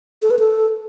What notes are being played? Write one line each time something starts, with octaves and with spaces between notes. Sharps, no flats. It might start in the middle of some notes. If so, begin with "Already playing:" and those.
A4
B4
A4